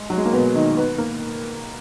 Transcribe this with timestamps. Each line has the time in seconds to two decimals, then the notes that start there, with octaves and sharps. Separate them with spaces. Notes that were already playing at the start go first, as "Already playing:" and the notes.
Already playing: G#3
0.10 F#3
0.17 G#3
0.25 A#3
0.33 B2 B3
0.55 D#3 D#4
0.77 B3 B4
0.98 A#3 A#4